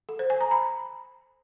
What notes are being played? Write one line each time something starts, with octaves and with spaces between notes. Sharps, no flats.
A4
C5
G#5
A#5
B5